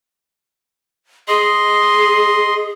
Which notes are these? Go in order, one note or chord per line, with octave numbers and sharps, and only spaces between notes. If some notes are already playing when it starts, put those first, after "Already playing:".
G#4 D#5 C6